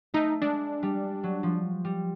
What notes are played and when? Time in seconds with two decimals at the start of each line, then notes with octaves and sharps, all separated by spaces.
0.14 A3 D#4
0.42 G#3 D4
0.83 G3
1.23 F#3
1.43 F3
1.85 G3